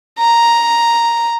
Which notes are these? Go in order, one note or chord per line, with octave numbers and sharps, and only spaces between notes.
A#5